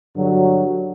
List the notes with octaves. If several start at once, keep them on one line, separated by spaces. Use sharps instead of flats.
G2 D3 F#3